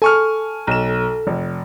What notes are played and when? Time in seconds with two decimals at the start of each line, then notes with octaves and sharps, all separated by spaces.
0.02 A4 G#5 C#6 F6
0.67 B1 E7
1.27 F1